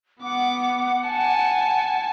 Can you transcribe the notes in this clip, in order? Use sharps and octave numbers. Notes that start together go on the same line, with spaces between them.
B3 F#5 D6
G#5 A5